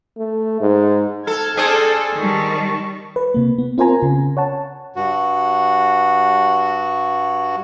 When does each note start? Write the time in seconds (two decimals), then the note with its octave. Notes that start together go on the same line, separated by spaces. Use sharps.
0.17 A3
0.61 G#2
1.27 A4 F6 G#6
1.57 C4 D4 G#4 A4
2.17 D#3 G3 A5 C#6
3.16 B4
3.34 C3 A#3
3.58 B3
3.78 C4 F4 A#4 C5 G#5 A#5
4.02 C#3
4.37 C#5 F#5 A5
4.96 G2 F#4